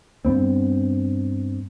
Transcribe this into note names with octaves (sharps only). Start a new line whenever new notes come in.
G2 B3 C4